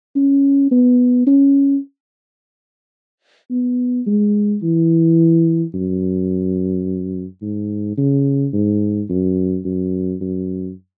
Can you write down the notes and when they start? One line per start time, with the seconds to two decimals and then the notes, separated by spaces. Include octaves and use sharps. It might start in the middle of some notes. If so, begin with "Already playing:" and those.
0.16 C#4
0.71 B3
1.27 C#4
3.51 B3
4.07 G#3
4.63 E3
5.74 F#2
7.42 G#2
7.97 C#3
8.53 G#2
9.09 F#2
9.65 F#2
10.21 F#2